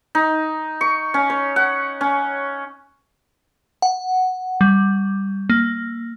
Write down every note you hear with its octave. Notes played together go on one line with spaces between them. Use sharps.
D#4
C#6
C#4
C#5
F#5
C#4
F#5
G3
A#3